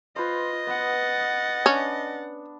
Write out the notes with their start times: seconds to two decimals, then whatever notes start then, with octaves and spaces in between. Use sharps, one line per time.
0.16 F4 B4 C5 D#5
0.67 B3 F#5 A6
1.66 C#4 D4